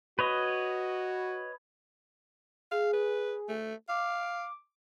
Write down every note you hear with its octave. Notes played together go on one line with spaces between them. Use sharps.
F#4 B4 C#5 D#5
G#4 F5
B4
A3
F5 D6